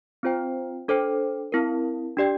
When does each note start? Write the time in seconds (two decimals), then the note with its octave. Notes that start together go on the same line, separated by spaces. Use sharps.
0.23 C4 F4 C5 G5
0.88 D4 A4 C5 G5
1.52 C4 E4 A#4
2.17 D4 G4 D5 G5